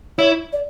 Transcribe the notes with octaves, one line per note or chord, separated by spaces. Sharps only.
E4 C#5
D5